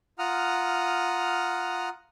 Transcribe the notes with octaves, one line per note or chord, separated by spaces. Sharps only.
F4 F#5 A#5 D#6 F6